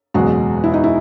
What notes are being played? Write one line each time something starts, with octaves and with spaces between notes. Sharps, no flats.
F#1 E2 B2 F#3 G#3 F#4
E4
D#4
E4